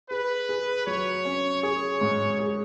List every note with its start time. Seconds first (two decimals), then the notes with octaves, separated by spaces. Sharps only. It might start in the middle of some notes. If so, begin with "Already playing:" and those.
0.10 G#4 B4
0.49 G#4
0.87 F#3 C#5
1.25 C#4
1.63 G#4 C#5
2.01 G#2
2.39 G#4